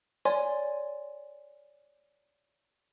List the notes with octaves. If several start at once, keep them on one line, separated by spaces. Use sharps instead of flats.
C#5 D5 G#5 C6